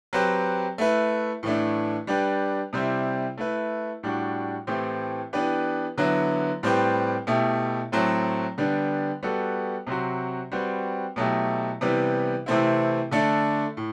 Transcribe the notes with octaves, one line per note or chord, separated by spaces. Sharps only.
F#3 C4 G4 B4
A3 E4 B4
A2 E3 A3 D4
G3 D4 G4 B4
C3 G3 C4 E4
A3 E4 B4
A2 G3 D4 F#4
A2 E3 A3 C4 G4
E3 B3 D4 G4 B4
D3 F#3 B3 E4
A2 G3 C4 G4 B4
B2 A3 E4 G4
A2 F#3 A3 C4
D3 G3 B3 D4
G3 B3 F#4 A4
C3 F#3 C4 F#4
G3 C4 F#4 B4
B2 F#3 A3 E4 G4
C3 E3 G3 B3
C3 E3 A3 C4 E4
D3 A3 D4 A4
A2